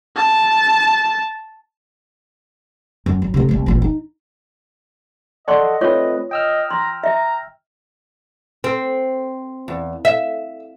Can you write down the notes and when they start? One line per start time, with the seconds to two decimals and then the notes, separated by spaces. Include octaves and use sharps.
0.17 A5
3.06 F#2
3.22 F#3
3.34 C3 A3
3.49 C2 A3
3.66 A1 A#2
3.82 D#4
5.48 A4 D5 D#5 F#5 C6 C#6
5.81 A3 C4 F4 B4 C#5 C#6
6.31 D#5 G5 E6 F6
6.71 A#5 C6
7.04 E5 A#5
8.64 C4
9.68 E2
10.05 E5